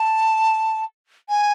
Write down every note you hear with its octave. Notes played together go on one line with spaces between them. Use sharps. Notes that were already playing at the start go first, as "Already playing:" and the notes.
Already playing: A5
G#5